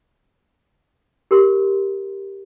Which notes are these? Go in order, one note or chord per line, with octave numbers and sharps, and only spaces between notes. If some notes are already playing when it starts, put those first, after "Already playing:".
G4 A#4 C6